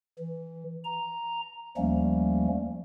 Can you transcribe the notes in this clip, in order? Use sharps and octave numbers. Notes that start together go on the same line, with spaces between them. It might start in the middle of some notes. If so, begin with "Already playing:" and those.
E3
A#5
D#2 F3 G3 A3 A#3 C#4